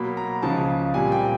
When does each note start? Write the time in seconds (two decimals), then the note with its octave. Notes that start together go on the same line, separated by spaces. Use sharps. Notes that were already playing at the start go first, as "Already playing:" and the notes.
Already playing: B2 F#3 A#3 B5
0.17 A#5
0.42 C#2 C#3 F3 A5
0.94 A#2 G3 C4 G#5
1.12 G5